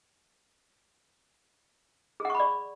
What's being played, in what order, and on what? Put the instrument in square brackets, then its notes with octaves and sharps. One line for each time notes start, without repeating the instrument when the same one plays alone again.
[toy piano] G#4
F#5
C#6
B5
D5